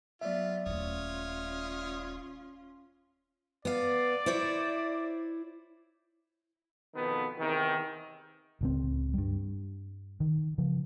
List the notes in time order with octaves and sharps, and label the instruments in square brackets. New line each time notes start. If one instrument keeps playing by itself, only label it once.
[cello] F#3 B3 [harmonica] F4 [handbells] D5 E5
[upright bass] D#1 A3 [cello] C#4 F4 [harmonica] C#5 D#6 F6
[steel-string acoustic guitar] B3 F5 [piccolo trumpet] D5
[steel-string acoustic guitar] E4 C5 C#5
[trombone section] F2 B2 D#3 B3
E2 C3 D#3
[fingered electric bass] D1 C#2 C4
G2 G3
D#3
C#3 F3